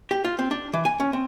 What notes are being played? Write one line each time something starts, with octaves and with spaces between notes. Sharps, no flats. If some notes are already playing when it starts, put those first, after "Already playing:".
G4
F4
C4
D4
E3
G#5
C#4
C4